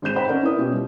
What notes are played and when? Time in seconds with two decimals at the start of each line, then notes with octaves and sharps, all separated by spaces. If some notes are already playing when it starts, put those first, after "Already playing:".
0.02 G#1 C4 G#4 G6 E7
0.16 C5 D#5 F#5 G5 A#5 B5
0.27 C4 C#4 A#4 D5 E5
0.43 E4 B4 D#6
0.58 B2 C#4 F4 G4
0.72 G3